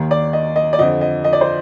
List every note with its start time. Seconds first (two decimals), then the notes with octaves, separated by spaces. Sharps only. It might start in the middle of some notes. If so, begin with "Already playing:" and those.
Already playing: D#2 D#3
0.11 D5
0.33 D#5
0.56 D#5
0.73 D5
0.78 F2 D3 F3 D#5
1.01 D#5
1.24 D#5
1.33 D5
1.41 C5